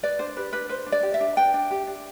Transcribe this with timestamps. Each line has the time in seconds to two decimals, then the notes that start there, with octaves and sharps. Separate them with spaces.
0.03 B4 D5
0.19 D4 C5
0.37 G4 B4
0.53 D4 B4
0.69 B4 C5
0.86 D4
0.92 D5
1.03 G4
1.14 E5
1.21 D4
1.36 B4 G5
1.54 D4
1.71 G4
1.87 D4